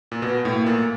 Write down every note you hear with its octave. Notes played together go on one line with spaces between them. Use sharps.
A#2
B2 B3
A2
A#3
A#2